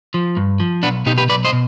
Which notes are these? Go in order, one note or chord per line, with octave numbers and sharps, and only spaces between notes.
F3
G2
F3
B1 B3 D4
B2 D#4 G4
G4 B4
B1 B4 D5
C5 D#5
B2